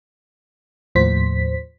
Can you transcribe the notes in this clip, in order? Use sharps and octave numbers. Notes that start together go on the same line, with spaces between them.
D#2 A2 F3 C5 B6